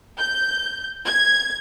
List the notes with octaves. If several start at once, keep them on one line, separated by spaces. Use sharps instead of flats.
G6
G#6